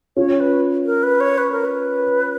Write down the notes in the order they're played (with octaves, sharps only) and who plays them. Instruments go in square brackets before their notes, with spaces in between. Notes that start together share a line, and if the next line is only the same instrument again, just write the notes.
[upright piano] C#4 F4 [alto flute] C#5
[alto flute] B4
A#4
B4
C#5
B4
A#4
B4